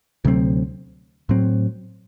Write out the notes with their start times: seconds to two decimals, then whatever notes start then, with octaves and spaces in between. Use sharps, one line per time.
0.25 D2 C3 F#3 C4
1.29 A2 F#3 C4